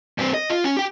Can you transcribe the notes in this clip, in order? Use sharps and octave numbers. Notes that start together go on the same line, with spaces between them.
G2 C4
D#5
F4
C#4
G4 G5